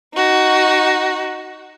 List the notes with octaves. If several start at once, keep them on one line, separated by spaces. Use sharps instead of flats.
D#4 F#4